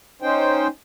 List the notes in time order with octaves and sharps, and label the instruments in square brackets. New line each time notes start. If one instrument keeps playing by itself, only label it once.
[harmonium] C#4 D#4 C5 G5